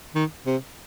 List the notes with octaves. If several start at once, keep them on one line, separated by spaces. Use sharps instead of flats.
D#3
C3